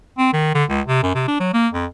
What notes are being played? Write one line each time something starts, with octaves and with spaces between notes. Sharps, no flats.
C4
D#3
D3
C#2
C3
F#2
C3
D4
F#3
A#3
F2